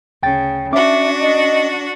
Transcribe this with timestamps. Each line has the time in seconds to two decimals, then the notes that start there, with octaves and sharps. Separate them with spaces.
0.23 D2 C#3 G5 A6
0.73 C#4 D4 F#4 E5 D6
1.20 D#5